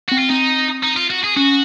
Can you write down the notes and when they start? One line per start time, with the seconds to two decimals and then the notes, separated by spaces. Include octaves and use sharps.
0.09 C4 F#4
0.18 F4
0.29 C4 D#4
0.83 D#4
0.97 F4
1.10 F#4
1.24 G#4
1.36 C#4 F#4